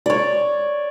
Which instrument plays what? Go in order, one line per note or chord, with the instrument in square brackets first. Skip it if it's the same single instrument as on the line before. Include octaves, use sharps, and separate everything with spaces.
[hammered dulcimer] C#5 D5